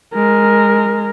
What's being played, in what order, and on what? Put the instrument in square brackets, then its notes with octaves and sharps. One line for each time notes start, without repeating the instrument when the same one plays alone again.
[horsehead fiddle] G#3 A#4